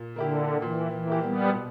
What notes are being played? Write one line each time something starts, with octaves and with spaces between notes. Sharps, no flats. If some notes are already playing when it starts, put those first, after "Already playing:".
Already playing: A#2
D3 A#3 E4 G4
A#2 E3
E3
A#3 E4 G4
G3 B3
B2